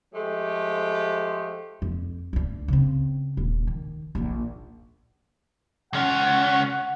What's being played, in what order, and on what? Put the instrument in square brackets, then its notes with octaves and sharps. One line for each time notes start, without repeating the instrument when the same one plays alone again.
[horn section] F3 G#3 A3 G4
[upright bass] F2
D2 D4
C#3 C4
D#1
D#3
A#1 D#2
[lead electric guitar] C#2 C#4 [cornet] F#5